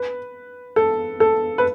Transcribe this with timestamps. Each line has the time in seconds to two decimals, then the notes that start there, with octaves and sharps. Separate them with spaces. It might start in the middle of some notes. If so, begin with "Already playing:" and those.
Already playing: B4
0.76 A4
1.20 A4
1.58 B4